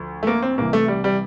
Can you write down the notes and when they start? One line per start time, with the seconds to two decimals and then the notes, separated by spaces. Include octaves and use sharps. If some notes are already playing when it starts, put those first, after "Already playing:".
Already playing: D2 F3
0.23 A3
0.27 A#3
0.42 C4
0.58 C2 C3 E3 A#3
0.73 A3
0.88 G3
1.04 G3